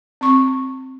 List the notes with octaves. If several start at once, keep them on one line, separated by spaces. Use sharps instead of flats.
C4 C#6